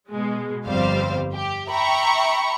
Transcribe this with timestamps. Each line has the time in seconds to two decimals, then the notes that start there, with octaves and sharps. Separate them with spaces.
0.10 B2 G#3
0.67 G1 F2 G3 C4 C5 F5
1.33 G4
1.69 E5 G5 A#5 B5 C#6